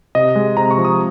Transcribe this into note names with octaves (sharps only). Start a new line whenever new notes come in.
C3 D#5
G#3
C3 A#5
C#6
F3
D#6